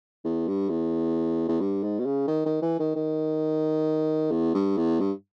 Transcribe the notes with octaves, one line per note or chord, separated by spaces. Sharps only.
E2
G2
E2
E2
G2
G#2
B2
C#3
D#3
D#3
E3
D#3
D#3
E2
G2
E2
G2